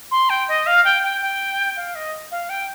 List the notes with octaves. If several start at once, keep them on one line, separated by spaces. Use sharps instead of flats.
C6
G5
D#5
F5
G5
G5
G5
F5
D#5
F5
G5